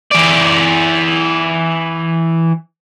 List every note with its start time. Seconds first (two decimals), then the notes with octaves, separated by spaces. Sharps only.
0.12 E3 D5